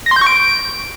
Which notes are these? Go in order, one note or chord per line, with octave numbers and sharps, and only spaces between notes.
A#6
C6
G6
C#6
D7